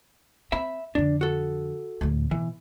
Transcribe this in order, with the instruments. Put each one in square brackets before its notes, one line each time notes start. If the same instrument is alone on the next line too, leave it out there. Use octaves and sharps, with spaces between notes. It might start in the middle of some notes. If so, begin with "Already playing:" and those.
[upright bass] C4 [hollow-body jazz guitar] E5 B5
[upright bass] F2 D3 [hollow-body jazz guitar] D4
[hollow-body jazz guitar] F#4 A4
[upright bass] D2 A2
[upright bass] B2 [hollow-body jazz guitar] E3